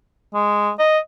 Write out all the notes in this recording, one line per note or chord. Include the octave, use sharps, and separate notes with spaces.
G#3
D#5